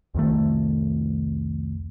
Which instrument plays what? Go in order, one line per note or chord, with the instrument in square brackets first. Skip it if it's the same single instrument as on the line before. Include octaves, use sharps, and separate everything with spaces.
[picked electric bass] C2 F2 D#3 A3